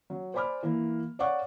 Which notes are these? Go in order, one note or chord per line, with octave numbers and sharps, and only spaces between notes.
F#3
C5 D5 G#5 B5 D6 F6
E3 A#3
C#5 D5 F5 F#5 C#6 D6